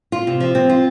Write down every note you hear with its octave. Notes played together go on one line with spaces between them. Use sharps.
F4
C3
F3
C4
F4